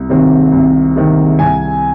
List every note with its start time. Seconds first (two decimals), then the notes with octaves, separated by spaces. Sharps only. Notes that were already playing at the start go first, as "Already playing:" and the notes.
Already playing: C2
0.09 C3 D#3 C4
0.52 C2
0.96 C3 D#3 C4
1.39 C2 G#5